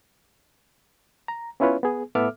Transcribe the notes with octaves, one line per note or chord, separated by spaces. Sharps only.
A#5
B3 C#4 E4 F4 B4 C#5
B3 G#4
A2 B3 A4 E5 D6 F6